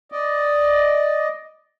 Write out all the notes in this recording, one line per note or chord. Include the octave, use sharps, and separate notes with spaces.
D5 D#5